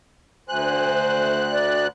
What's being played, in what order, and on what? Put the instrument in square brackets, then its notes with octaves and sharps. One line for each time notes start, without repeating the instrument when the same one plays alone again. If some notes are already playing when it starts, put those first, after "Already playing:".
[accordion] D2 F#6 [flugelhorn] C5 [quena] G#5
[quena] D5